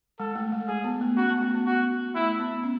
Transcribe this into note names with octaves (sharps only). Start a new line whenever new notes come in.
G#3 A4
A3
G#3
G#3 G#4
B3
A3
C#4 F#4
B3
A3
B3
F#4
A3 E4
B3
C#4